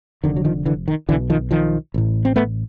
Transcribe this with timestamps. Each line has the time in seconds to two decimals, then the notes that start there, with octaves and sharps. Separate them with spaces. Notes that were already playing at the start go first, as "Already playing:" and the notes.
0.24 F1 F2 D3 D#3
0.36 F#3
0.45 D#3 F3
0.66 D3 E3
0.88 D#3
1.09 B1 D3 E3
1.12 B2
1.30 D#3 F3
1.51 D#3 F3
1.94 A1 A2
2.25 C4
2.36 A3 B3